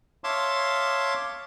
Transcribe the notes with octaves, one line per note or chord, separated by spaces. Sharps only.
C#5 E5 F5 A5 C6 D6